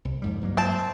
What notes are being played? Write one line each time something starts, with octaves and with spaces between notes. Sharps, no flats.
C2
F2 G#2 G3
G2 F#3 A#3
C4 A5